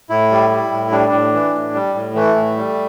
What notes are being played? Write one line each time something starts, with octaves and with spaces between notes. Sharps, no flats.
A2 E4
G3
G3
A2
G3 D4
A2
E3
A2
G3
A2
E3 A3
A2
G3